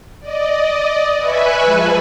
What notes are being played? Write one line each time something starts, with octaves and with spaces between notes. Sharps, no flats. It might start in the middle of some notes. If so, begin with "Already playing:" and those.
D5 D#5
B4 E5 G#5 B5 C#6 F#6
F3 G#3 B4 G#5 A5